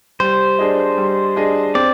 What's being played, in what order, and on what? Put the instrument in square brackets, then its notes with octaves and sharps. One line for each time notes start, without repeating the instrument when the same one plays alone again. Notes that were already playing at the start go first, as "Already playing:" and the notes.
[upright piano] G3 [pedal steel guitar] C5
[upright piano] D4 G#4 D#5
G3
D4 G#4 D#5
[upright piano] C4 [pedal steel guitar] D5